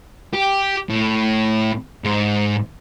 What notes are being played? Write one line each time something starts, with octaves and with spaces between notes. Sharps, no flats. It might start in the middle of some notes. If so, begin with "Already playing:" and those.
G4
A2
G#2